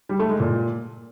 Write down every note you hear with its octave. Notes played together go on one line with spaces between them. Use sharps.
G3
A3
G#3
A#2